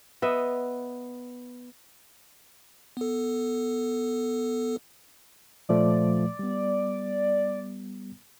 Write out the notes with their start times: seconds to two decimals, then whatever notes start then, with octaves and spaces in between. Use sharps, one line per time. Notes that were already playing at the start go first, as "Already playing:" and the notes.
0.22 B3 D#5 E5
2.97 B3 A4
5.69 A#2 F3 A3 D5
6.39 G3 B3